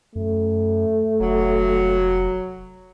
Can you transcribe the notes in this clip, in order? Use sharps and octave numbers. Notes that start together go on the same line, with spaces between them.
F#2 A3
F1 F#3